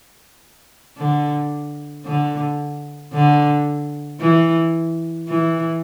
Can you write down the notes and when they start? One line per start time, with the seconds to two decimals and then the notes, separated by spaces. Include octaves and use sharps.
0.98 D3
2.06 D3
3.13 D3
4.20 E3
5.28 E3